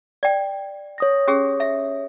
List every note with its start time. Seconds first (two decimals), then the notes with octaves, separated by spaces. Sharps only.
0.23 D5 G5
0.98 C#5 D#6 A#6
1.28 C#4 G4 G#4
1.60 E5